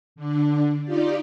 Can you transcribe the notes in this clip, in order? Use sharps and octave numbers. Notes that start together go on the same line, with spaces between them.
D3 D4
D#4 F4 G4 D5